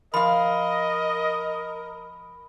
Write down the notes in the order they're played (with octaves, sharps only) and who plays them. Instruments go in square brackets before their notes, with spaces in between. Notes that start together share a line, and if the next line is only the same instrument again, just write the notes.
[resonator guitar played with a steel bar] F3 F5 [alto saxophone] A#4 [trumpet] D#5 [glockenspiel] B5